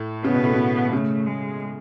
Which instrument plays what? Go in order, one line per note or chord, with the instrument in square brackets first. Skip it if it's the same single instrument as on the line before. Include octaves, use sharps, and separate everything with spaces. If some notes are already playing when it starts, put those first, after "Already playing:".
Already playing: [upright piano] A2
[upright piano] C#3 [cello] B3
[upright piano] B2
A2
B2
[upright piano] C#3 [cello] A3
[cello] G#3